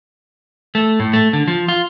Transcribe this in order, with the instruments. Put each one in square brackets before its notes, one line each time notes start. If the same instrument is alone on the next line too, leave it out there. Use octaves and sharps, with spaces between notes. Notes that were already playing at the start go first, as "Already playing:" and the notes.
[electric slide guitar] A3
A2
A3
D3
F3
F4